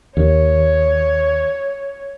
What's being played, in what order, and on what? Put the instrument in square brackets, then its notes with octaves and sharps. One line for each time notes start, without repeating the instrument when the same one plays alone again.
[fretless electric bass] D#2 [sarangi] C#5